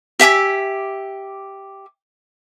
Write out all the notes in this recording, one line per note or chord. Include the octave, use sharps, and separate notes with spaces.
G4 E5 G#5 D6